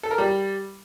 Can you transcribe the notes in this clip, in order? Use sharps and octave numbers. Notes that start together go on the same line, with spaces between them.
A4
A#4
G3